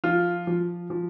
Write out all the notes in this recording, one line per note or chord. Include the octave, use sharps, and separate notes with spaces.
F3 F4
F3
F3